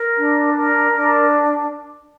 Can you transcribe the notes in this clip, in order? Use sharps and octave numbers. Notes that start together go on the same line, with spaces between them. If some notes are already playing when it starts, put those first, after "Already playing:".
Already playing: A#4
D4
A#4
D4